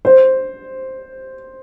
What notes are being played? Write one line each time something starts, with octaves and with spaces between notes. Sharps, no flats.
C5